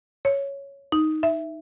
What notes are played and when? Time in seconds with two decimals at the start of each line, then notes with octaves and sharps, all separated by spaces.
0.25 C#5
0.92 D#4
1.23 E5